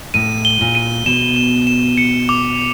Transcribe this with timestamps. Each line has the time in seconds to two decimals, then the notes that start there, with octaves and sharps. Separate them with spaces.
0.14 A2 D#7
0.45 G7
0.61 A#2
0.75 D#7
1.06 B2 E7
1.36 E7
1.67 E7
1.98 C#7
2.29 D6